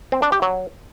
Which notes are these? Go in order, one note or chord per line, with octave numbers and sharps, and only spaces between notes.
C4
D4
G4
F#3